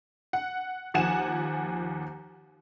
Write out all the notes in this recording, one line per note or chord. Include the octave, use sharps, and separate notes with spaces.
F#5
D#2 F3 F#5 G#5 E7